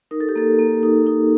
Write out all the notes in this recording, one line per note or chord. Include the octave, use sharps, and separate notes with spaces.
D#4 A#4
A4
G4
A#3 A4
A#3
D#4
D#4